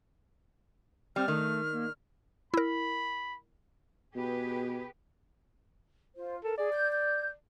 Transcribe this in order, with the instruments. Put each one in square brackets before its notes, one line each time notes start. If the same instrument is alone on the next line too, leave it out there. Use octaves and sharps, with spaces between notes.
[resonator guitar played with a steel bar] G3 [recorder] C4 [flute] F6
[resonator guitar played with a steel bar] D#3 [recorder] A3
[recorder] A#3
[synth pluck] E4 A#4 [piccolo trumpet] B5
[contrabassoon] B2 [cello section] G4 G#4 B4
[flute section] F4 C5
[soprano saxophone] A4 [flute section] A#4
[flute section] G#4 [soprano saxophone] D5
[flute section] G6
G6